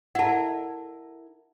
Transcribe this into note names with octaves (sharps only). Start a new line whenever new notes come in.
E4 A#4 F#5 A5